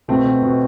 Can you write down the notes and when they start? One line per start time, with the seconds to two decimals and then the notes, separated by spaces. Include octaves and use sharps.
0.08 B2 A3 C4
0.25 B2
0.42 B2